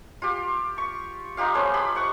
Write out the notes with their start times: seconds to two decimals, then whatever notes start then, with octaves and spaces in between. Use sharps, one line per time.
0.22 F4 G4
0.78 C#6
1.37 D#4 F4 G4 F5
1.54 A3 B3 C#4 C5
1.74 G4 B5 C6
1.95 C5 F#5 C#6